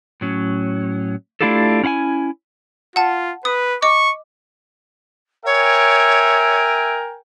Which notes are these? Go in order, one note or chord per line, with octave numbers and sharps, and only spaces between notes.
A2 F#3 C#4
A3 D4 E4 F4 G4 A4
C#4 E4 F5 G#5
F4 F#5 A5
B4 D#6
D#5 C#6 D6
A#4 C#5 E5 G5 G#5